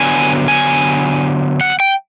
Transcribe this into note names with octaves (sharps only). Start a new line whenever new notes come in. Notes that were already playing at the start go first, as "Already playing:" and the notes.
Already playing: D3 F#3 B3 D4 G#5
G#5
F#5
G5